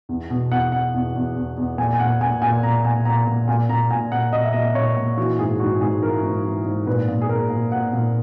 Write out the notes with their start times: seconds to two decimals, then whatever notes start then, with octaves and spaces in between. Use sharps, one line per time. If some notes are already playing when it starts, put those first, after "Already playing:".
0.09 E2
0.30 B2
0.51 E2 F#5
0.72 E2 F#5
0.94 E2
1.15 E2
1.36 E2
1.57 E2
1.78 A#2 G#5
1.93 G#5
1.99 A#2 F#5
2.21 A#2 G#5
2.42 A#2 G#5
2.63 A#2 A#5
2.85 A#2 G#5
3.05 A#2 A#5
3.27 A#2
3.48 A#2 G#5
3.69 A#2 A#5
3.90 A#2 G#5
4.12 A#2 F#5
4.33 A#2 D#5
4.43 E5
4.53 A#2 D#5
4.75 A#2 C#5
4.97 A#2
5.17 E3 F#4
5.39 G#2 G#4
5.60 G#2 F#4
5.81 G#2 G#4
6.02 E3 A#4
6.23 G#2
6.45 E3
6.66 G#2
6.86 A#2 B4
7.08 A#2
7.21 G#4
7.29 A#2 A#4
7.50 A#2
7.71 A#2 F#5
7.93 A#2